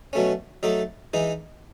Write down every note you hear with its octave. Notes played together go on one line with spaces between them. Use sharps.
B2 F#3 A3 C#4
F#3 A3 D#4 A4
E3 G#3 D#4